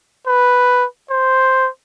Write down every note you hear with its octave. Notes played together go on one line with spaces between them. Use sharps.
B4
C5